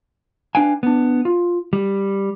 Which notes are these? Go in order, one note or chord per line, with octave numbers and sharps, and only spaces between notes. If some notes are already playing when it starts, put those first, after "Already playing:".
D4 B4 F5 G5 G#5
B3 D4
F4
G3